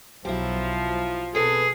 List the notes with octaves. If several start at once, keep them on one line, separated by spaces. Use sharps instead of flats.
B1 F3 F#3 E4 G4
B2 C4 G#4 A4 B4